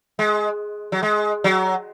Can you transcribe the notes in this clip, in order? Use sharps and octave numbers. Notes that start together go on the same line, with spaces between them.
G#3
F#3
G#3
F#3